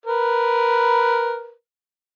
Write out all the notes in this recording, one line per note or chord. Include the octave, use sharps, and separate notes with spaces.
A#4 B4